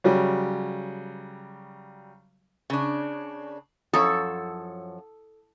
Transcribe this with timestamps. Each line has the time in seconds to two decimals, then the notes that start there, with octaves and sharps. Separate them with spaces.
0.04 C#3 F#3 G3
2.70 C#3 D4
3.93 F#2 F3 E4 A4 C#5 D#6